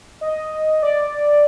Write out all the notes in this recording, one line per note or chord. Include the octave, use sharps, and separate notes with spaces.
D#5
D5